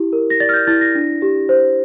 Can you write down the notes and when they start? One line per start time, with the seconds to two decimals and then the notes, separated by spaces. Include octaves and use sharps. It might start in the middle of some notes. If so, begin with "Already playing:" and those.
Already playing: E4 G4
0.13 A#4
0.30 A#6
0.40 D5 A6
0.49 F6
0.53 G6
0.67 E4 A6
0.81 A#6
0.95 D4
1.22 G4
1.49 C5